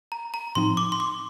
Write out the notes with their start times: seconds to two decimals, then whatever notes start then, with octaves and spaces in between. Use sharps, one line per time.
0.12 A#5
0.34 A#5
0.55 A2 F3 C4 D#4 C6
0.77 D6
0.92 C6
1.00 D6